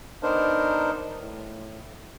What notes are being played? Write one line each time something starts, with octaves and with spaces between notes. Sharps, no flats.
B3 D4 D#4 A#4 C5
A2